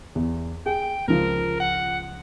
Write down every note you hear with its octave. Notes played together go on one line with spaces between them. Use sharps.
E2
G#4 G5
C#2 F3 A#4
F#5